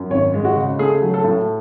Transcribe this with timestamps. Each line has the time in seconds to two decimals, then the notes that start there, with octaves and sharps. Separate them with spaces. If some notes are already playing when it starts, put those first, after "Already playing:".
Already playing: F#2
0.10 G#1 C#5
0.34 G#3
0.45 F#4
0.56 C#3
0.79 A3 G#4
1.02 F#3
1.14 A4
1.24 A2